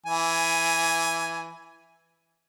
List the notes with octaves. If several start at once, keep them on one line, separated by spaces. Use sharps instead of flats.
E3 G#5